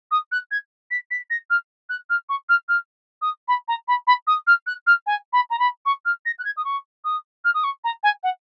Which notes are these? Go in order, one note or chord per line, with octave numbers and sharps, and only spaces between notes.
D#6
F#6
G#6
B6
B6
A#6
F6
F#6
F6
C#6
F6
F6
D#6
B5
A#5
B5
B5
D#6
F6
F#6
F6
G#5
B5
A#5
B5
C#6
F6
A#6
F#6
G#6
D#6
C#6
D#6
F6
D#6
C#6
A#5
G#5
F#5